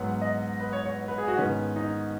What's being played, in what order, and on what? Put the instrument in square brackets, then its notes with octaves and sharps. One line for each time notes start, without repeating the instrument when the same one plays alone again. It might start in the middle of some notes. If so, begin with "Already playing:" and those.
Already playing: [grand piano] G#2 F#3 B3 F#5
D#5
B4
C#5
C#5
B4
G#4
F#4
G#2 D#3 B3 C#4
D#4